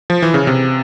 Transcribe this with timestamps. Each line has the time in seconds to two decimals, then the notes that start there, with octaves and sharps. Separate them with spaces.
0.10 F3
0.22 E3
0.34 C#3
0.47 C3